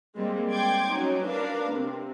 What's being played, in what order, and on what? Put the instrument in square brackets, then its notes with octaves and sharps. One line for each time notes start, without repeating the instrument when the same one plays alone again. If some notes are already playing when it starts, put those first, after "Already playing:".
[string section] G3 G#3 A#3 C4
D5 G5 C6 D6 G#6
F#3 C#4 D#4
D4 A#4 B4 F5
C3